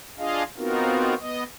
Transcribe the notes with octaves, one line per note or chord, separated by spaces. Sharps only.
D4 F4 G#4 D#5 F5
B3 C4 D#4 F4 F#4 A#4
B3 D#5